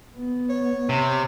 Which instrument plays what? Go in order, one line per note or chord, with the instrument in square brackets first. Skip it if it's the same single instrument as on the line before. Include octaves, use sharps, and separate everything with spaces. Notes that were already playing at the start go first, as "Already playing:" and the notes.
[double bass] B3
[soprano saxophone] C#5
[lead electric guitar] C3